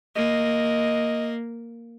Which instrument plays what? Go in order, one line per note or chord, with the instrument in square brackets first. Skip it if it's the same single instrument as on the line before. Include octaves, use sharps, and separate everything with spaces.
[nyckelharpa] A#3 [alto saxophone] D#5